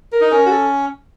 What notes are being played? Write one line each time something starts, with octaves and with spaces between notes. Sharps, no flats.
A#4
D#4
C#4 A#4
F#4
A4